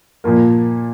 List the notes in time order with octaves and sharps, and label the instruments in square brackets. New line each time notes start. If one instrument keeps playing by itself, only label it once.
[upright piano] A#2 F3 A#3